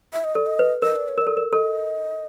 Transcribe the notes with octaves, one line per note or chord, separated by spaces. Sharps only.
E5
D#5
A4 D5
D#5
B4
A#4 D#5
D5
C#5
A#4 D#5
A4 D5
A#4
A4 D#5